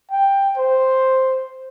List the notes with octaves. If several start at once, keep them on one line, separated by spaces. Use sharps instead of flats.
G5
C5